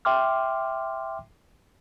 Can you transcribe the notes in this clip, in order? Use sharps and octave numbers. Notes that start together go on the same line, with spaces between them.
E5 G5 C6 D6 F6